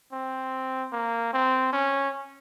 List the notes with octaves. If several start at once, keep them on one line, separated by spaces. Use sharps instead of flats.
C4
A#3
C4
C#4